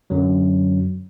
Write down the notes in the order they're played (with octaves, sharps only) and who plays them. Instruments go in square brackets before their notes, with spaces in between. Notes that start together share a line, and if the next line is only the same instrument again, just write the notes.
[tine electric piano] F#2 D3 F#3